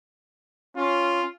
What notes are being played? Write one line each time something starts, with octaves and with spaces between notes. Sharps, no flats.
C#4 F4